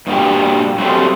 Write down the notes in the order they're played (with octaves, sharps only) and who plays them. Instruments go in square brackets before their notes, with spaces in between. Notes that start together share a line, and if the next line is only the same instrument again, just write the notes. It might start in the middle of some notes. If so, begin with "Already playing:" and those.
[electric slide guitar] G2 A#2 F#4 G4
F#3 G3 A3 C4 C#4